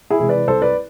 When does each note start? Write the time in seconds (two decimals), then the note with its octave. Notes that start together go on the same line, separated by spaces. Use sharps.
0.10 E4 G#4
0.19 C3 E3 G#3
0.29 B4 D5
0.48 C2 A4 C5
0.62 B4 D5